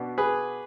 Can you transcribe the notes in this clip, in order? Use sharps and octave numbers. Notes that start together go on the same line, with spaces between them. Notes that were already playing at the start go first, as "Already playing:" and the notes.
Already playing: B2 B3 D4
G#4 B4